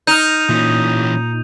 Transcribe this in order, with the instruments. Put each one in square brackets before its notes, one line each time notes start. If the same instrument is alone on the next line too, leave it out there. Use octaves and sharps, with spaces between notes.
[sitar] D#4 [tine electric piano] D#6 F6 [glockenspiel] G6 D#7 F7
[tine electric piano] A#2 [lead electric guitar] E3 C#4